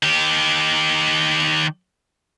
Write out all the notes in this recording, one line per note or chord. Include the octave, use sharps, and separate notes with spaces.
D#3 G4